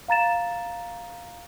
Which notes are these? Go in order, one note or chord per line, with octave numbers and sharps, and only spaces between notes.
F5 A#5 A6 E7